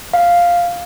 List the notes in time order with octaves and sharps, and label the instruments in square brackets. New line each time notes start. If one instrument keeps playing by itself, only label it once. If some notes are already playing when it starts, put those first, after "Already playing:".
[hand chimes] F5